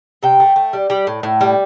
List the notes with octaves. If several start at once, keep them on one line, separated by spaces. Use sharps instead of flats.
C3 G5
A3
A3
G3
G3
A2
A2
G3